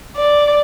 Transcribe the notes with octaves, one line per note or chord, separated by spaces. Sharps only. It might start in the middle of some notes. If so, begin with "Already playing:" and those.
D5